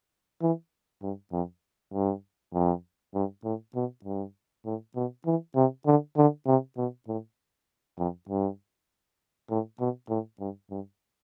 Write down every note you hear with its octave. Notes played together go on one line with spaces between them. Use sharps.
E3
G2
F2
G2
F2
G2
A2
B2
G2
A2
B2
E3
C3
D3
D3
C3
B2
A2
F2
G2
A2
B2
A2
G2
G2